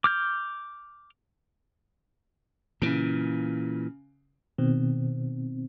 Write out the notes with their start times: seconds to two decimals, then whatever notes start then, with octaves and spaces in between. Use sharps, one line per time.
0.04 D6 F6 G6
2.82 A#2 C#3 E3 D7
4.58 B2 D#3 C4